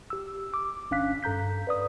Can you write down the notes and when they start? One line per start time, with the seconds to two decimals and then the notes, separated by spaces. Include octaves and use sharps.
0.10 G4 E6
0.54 D6
0.91 G1 C#4 D4 F5 F#6 B6
1.23 G2 A4 A#5 G6 B6
1.67 B4 D5 D#6